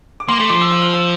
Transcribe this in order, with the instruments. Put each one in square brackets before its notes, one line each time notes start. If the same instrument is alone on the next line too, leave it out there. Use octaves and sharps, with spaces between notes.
[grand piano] D6
[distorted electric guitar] A#3 [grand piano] C6
[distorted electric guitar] A3 [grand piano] D6
[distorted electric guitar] F3 [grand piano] D6
[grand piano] E6
E6
F6
E6